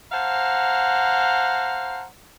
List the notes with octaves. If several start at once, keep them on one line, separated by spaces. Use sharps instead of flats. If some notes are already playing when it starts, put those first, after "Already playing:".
C5 F5 F#5 A5 A#5